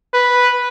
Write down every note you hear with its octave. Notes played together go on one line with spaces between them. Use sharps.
B4